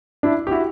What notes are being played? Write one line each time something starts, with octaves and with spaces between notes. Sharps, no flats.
D4 E4
G4
E4 F#4